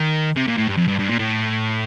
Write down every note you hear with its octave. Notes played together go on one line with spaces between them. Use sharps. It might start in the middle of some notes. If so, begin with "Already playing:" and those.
Already playing: D#3
C3
A#2
A2
G2
F2
G2
G2
A#2
A2